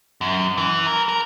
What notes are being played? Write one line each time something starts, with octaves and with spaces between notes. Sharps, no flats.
F#2
E3
A#4
A#4